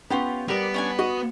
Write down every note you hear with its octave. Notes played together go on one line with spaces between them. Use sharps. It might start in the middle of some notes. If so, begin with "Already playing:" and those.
B3 C#4 F4 G4
G3 B3 A#4 D5
C#4 D4 G#5
F#4 D#5